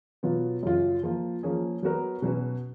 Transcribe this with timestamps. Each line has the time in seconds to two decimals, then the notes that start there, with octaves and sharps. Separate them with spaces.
0.23 B2 F#3 B3 F4
0.63 F#2 C#3 F#3 C#4 F4
1.03 F3 A#3 F4
1.43 F3 A#3 C#4 G#4
1.83 F#3 B3 F#4 A#4
2.22 B2 F#3 C#4 F#4 B4